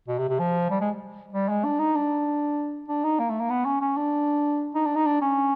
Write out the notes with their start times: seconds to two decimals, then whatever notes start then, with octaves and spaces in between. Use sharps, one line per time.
0.08 B2
0.18 C3
0.29 C3
0.39 F3
0.70 G3
0.81 G#3
1.33 G3
1.49 G#3
1.64 D4
1.79 D#4
1.95 D4
2.88 D4
3.04 D#4
3.19 A#3
3.30 A3
3.40 A#3
3.50 B3
3.65 C#4
3.81 C#4
3.97 D4
4.75 D#4
4.85 D4
4.95 D#4
5.06 D4
5.21 C#4